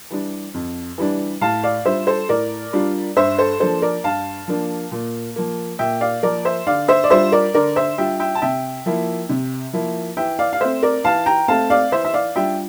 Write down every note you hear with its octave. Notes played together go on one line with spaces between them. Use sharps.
E3 G3 D4
F2
E3 G3 D4
A2 F5 A5
D5 F5
G3 D4 F4 C5 E5
A4 C5
A2 A#4 D5
G3 D4 F4
G2 C5 E5
A4 C5
F3 A#3 D4 A4 C5
A#4 D5
G2 F5 A5
F3 A#3 D4
A#2
F3 A#3
A#2 E5 G5
D5 F5
F3 A#3 A#4 D5
C5 E5
D3 D5 F5
C5 E5
D5
G3 D4 F4 C5 E5
A#4 D5
D3 A#4 D5
C5 E5
G3 D4 F4 E5 G5
E5 G5
A5
C3 E5 G5
F3 A#3 E4
C3
F3 A#3 E4
E3 E5 G5
D5 F5
F5
A3 C4 C5 E5
A#4 D5
E3 F5 A5
G5 A#5
A3 C4 F5 A5
D5 F5
E3 C5 E5
E5
D5 F5
G3 D4 F4 E5 G5